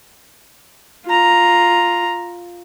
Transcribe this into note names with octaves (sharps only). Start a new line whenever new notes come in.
F4 A#5